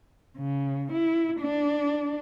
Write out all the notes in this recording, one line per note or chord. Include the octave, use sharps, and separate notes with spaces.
C#3
E4
D4